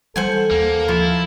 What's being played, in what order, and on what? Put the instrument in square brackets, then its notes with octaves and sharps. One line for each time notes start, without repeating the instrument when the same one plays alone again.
[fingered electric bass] E3 G3 [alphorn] A4 [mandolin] C5 F#5 G#5
[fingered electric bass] D#2 [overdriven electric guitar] A#3
[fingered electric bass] F3 [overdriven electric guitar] E4 [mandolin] F4